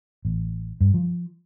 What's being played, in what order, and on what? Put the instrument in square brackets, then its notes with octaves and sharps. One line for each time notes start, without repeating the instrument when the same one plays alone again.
[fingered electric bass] A1
G2
F3